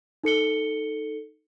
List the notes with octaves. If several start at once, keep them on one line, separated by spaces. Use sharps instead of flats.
D#4 A4 C#7 G7